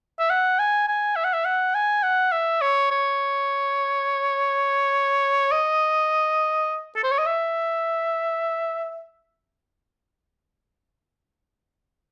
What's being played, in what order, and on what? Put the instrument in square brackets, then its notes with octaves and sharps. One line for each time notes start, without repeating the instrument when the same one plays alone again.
[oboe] E5
F#5
G#5
G#5
E5
F#5
E5
F#5
G#5
F#5
E5
C#5
C#5
D#5
A4
C5
C#5
D#5
E5